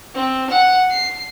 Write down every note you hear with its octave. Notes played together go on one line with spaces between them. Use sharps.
C4
F#5
C7